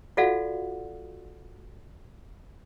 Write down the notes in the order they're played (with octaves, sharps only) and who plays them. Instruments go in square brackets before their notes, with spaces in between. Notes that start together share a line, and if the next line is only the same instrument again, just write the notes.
[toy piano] F4 F#4 A4 D5 F5 F#5